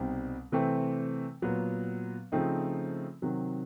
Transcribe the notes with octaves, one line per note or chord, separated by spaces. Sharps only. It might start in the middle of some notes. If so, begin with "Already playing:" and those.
Already playing: C2 B2 G3 C4 D#4
C3 E3 A3 C4
A#2 F#3 B3
C#3 F3 A3 C4 D#4
C3 D#3 F#3